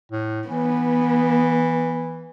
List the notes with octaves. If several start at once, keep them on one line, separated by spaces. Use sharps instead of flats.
A2
E3 B3